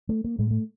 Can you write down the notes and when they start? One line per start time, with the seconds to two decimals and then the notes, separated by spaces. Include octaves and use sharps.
0.09 A3
0.24 A#3
0.39 A2 G#3
0.51 A3